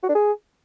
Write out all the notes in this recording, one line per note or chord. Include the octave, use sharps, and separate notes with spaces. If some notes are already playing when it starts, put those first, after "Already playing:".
F#4
D4
G#4